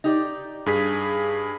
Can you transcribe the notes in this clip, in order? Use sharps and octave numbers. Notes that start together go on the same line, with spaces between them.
D#4 G4 D5
G2 G#4 B6